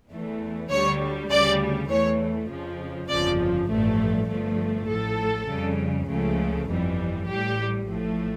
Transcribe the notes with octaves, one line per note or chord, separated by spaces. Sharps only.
E2 E3 A3
D2 D3 G3 C#5
D2 C#3 G3 D5
E2 E3 A3 C#5
F2 C#3 F3
G1 F2 C#3 F3 D5
A1 G2 F3 A3
G1 G2 F3 A3
A1 A2 F3 A4
F2 C#3 G3
C#2 C#3 F3 A3
G1 F2 E3 G3
A1 A2 G3 G4
A1 A2 F3 A3